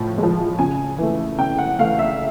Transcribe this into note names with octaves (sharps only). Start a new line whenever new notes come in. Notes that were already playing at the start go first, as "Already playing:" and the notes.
Already playing: A2 F3
G#3
F3
C#3 G#5
E3 A3
C#3 G5
F#5
E3 A3 F5
E5